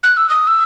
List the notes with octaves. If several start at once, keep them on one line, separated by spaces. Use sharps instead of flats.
F#6
E6
D#6
E6